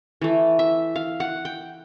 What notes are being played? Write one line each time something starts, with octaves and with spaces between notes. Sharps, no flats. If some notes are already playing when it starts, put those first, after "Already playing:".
E3 A3
E5
F5
F#5
G5